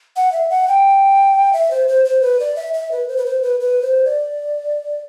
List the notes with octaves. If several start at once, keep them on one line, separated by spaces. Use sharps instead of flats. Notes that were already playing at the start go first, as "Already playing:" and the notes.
F#5
E5
F#5
G5
E5
C5
C5
C5
B4
D5
E5
E5
B4
C5
B4
C5
B4
B4
C5
D5